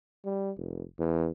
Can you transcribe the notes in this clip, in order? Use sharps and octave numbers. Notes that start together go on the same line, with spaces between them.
G3
F1
E2